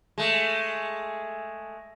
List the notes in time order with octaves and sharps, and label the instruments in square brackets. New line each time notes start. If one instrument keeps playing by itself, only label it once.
[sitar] G#3 A3